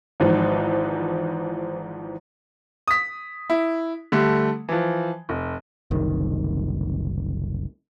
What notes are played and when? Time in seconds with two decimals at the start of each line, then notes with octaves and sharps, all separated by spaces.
0.20 G#1 G#2 E3 F3
2.88 D#6 B6
3.50 E4
4.12 D3 G3 A3
4.69 E3 F3
5.29 F1
5.91 F#1 C2 D#3